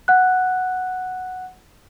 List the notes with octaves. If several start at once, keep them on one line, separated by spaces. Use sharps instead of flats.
F#5 F#6